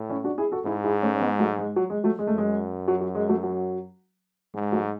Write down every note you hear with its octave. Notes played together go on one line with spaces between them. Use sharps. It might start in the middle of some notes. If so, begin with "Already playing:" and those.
Already playing: A2
C#4 E4
D4 F#4
E4 G#4
F#4 A4
G#2 E4 G#4
E4 G#4
A3 C#4
C#4
G#3 B3
F#3 A3
G#3
F#3
G#3
F#3 A3
G#3
F#2 A3
G#3
F#3
F#3
G#3
F#3 A3
F#3
G#2 G#3
F#3 A3